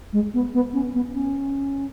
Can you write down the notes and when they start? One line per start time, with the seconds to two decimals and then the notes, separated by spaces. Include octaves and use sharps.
0.13 G#3
0.34 B3
0.54 B3
0.74 C#4
0.94 B3
1.13 C#4